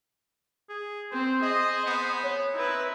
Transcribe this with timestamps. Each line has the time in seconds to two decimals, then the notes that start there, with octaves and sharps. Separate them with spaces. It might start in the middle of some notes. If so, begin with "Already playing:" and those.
0.69 G#4
1.12 C4 C5
1.42 G#4 D#5
1.86 B3
2.24 C#5
2.54 C4 D#4 E4 B4